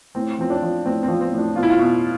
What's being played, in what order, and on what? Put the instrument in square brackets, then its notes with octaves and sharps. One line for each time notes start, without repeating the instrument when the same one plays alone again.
[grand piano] A2 C4
F3 C4
D4
F3
A2 C4
C4
F3
C4
A2
D4
B2 F4
E4
F4
B2